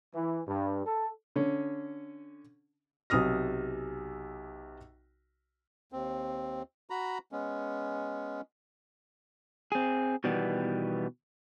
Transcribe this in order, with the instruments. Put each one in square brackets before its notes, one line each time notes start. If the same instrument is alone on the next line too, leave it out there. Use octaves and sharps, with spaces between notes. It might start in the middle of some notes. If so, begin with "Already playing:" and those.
[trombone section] E3
G2
A4
[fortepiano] D3 C#4
[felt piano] B1 C3 D#6 F6 A#6
[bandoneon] D#2 C4
F#4 A#5 B5
G#3 B3 C#4
[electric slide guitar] C4 G#4
B2 D#3 E3 G3 B3